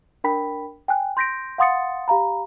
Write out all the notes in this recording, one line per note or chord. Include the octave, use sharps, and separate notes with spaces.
D4 A#4 G5 B5 B6
G5 G#5 F#6
C6 G6 A#6 B6 D7
F5 F#5 C6 D#6 A6 C#7
G4 F5 A#5 B5